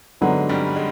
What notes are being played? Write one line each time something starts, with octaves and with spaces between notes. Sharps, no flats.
G#2 D3 F#3 G#3 B3
G2 G3
G#3